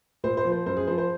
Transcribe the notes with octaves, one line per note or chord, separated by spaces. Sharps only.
A#2 C5
C5
F3
C5
F#2 C5
G#4
F3 C5
C5